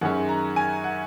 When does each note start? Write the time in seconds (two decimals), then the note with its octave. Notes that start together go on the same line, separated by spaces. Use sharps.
0.01 F#2 D#3 G#3 C#4 F#5
0.29 A#5
0.56 G#5
0.84 F#5